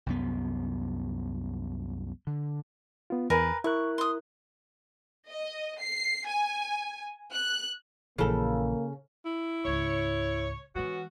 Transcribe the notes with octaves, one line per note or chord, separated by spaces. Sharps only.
C2 F#2 B3
D3
B3 F4
E2 A#4 B4 G#5
E4 A#4 C#6 F#6
C6 D#6
D#5
C7
G#5
F#6
A#1 C#3 E3 A#3 A4
E4
C#2 G#2 C#5
E3 G#3 B3 C#4 F#4